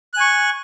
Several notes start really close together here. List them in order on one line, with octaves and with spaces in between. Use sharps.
F#6 G#5 C#6